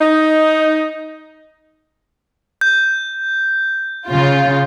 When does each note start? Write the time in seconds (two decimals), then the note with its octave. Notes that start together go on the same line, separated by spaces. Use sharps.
0.01 D#4
2.61 G6
4.08 C#3 F4